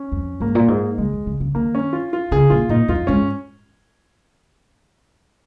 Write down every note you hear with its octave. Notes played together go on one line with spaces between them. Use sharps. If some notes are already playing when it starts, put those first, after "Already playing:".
Already playing: C#4
F2
G#2 A#3
A#2
G#2
C#3 G#3
D#3
C#3
C#3
D#3 A#3
C#4
F4
F4
C#3 G#4
A#2 F4
A#2 D#4
F2 F4
G#2 C#4